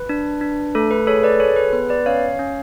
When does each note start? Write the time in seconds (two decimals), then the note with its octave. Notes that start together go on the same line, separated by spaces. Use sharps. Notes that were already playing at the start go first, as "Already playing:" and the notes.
Already playing: B4
0.09 D4
0.41 D4
0.75 A3 A4
0.91 B4
1.07 G#4 A4 C#5
1.23 B4 D5
1.40 G#4 A4 C#5
1.56 B4
1.73 B3 B4
1.89 B4 D5
2.06 C#4 C#5 F5
2.39 C#4